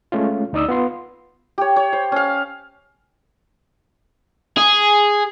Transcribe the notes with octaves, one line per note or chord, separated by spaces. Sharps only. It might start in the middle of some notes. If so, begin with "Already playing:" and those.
G#3 A3 C#4 F4
D2 D#4 D5 D#6 E6
B3 F4 C6
G4 C#5
C#5
C5
C#4 F5
G#4